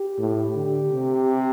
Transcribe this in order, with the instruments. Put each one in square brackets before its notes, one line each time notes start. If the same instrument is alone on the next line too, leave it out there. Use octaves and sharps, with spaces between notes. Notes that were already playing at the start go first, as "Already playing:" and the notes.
Already playing: [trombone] G4
[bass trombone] A2
D3
C3